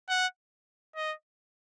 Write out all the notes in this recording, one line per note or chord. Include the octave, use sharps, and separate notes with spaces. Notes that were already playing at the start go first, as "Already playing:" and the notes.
F#5
D#5